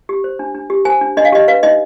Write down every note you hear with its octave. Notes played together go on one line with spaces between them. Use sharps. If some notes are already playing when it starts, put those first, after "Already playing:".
G4
C5
D4
D4
G4
C5 G#5
D4
D4 D#5
F5
G4 D#5
B4 F5
D#4 D#5